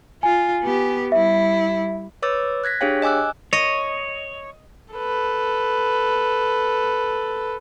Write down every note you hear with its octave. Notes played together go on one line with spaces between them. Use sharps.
F4 G#5
B3 G4
G3 E4 E5
B4 C#5 D6 E6 A6
F#6 G#6 A#6 B6
D4 G4 G#4 C#5 F5 G5
D#5 G#5 D6 E6 F#6
C#5 D#5
A4 B4